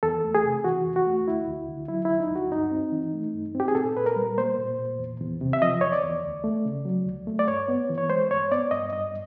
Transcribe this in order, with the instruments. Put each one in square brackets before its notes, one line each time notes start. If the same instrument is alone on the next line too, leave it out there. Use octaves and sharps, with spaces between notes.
[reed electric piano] E2 A4
A3
G#4
C3
E3 F#4
E2
F#4
A3
D2 E4
D2
D3
F#3 E4
E4
D2
D#4
D2
F#4
G2 D#4
C4
E3
A3
G2
C4
G4
G#4
A#2 A4
A#2 B4
A#4
G3
A#3 C5
A#2
A#2
E2
E2
C3
E5
F3 D#5
E2 C#5
D5
E2
D2
A3
C#3
F#3
D2
A3
D5
G2 C#5
B3
E3
C#5
G#3 C5
G2 C#5
B3 D5
G2 D#5
G2 D#5